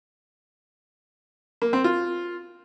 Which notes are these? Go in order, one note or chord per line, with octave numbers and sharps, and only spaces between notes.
A#3
C4
F4